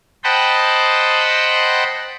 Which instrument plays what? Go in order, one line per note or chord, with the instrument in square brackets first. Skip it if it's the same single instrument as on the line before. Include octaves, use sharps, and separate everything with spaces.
[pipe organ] C5 D#5 F#5 G5 A5 B5